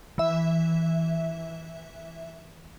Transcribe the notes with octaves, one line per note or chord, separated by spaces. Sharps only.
E3 E5